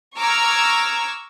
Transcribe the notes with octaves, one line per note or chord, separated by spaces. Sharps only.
A#5 C#6 D6 E6 F6 G#6